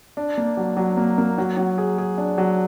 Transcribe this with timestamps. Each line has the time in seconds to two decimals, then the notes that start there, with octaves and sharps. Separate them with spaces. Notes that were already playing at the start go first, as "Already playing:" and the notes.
0.17 D4
0.37 A#3
0.57 F#3
0.77 F#3
0.97 A#3
1.18 A#3
1.38 F#3
1.57 F#3
1.78 G#4
1.98 G#4
2.18 D4
2.38 F#3